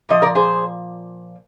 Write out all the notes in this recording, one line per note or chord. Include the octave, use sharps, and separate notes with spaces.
A#2 F3 D#5
A#4 D5
G#4 C5